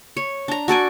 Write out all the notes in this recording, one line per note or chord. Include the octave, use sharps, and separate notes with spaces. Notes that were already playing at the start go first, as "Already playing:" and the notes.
C#5
D4 A#5
F#4 A4 D5 G#5